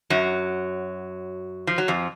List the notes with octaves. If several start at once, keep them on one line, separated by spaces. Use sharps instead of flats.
F#2 F#3
F3
F#3
F2 F3